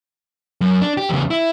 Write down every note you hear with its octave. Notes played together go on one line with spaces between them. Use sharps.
F#2
D4
G4
E2 C#3
E4